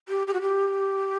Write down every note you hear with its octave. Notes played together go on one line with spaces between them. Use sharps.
G4
G4
F#4
G4